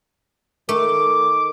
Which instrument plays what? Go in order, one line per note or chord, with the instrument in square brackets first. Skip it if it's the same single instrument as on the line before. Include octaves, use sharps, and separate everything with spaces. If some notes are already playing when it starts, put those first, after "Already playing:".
[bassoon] D#3 [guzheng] A3 [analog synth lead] D6